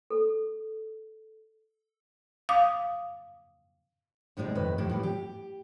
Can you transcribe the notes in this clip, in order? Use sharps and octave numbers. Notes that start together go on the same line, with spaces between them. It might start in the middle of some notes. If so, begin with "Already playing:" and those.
A4
F5 D6 D#6
D2 A2 C3 G#3 D#4 D5
F2 A2 D#3 B4 D#5
F2 A2 D#3 E4 G4
A2 E3 G3
G4